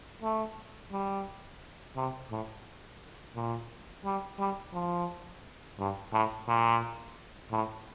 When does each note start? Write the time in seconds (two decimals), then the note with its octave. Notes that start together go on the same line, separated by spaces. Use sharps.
0.22 A3
0.92 G3
1.96 C3
2.31 A2
3.36 A#2
4.05 G3
4.39 G3
4.73 F3
5.79 G2
6.12 A2
6.48 A#2
7.51 A2